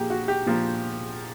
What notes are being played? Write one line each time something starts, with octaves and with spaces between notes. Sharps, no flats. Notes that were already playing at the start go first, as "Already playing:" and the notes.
Already playing: A#2 F3 A#3 G4 G#4
F#4
G4
A#2 F3 A#3